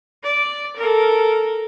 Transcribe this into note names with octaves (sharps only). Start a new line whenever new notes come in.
D5
A4 A#4